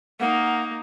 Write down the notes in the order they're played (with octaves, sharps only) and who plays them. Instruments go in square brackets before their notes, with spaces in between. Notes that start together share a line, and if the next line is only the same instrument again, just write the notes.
[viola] A#3 D#4 [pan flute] F#5